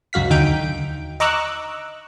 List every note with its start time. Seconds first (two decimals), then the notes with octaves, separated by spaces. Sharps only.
0.13 C#2 F#2 F#4 F5 B6
0.30 D#2 D3 D#4 G5 D7
1.20 D#5 A#5 C#6 D6 E6 F#6